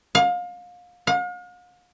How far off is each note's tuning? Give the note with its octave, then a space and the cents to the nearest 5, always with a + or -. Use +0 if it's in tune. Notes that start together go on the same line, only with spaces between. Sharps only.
F5 +30
F5 +45